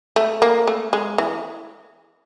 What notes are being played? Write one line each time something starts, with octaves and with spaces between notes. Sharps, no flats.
A3
A#3
A3
G#3
E3